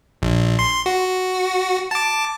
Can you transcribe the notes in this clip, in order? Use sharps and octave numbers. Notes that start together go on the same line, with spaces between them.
A#1
C6
F#4
A5 D6